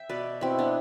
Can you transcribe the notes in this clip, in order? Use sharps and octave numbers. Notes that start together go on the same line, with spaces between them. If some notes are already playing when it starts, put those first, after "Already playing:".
Already playing: E5 G5
B2 B4 D5
B2 C4 E4
B3 D4